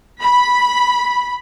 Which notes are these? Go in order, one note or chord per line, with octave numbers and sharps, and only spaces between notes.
B5